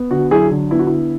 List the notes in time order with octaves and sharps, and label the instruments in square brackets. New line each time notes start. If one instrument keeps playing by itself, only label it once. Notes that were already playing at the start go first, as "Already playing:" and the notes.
Already playing: [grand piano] B3
D3 F#4
F#3 E4 G#4
D3
B3 E4
F#4
D3 E4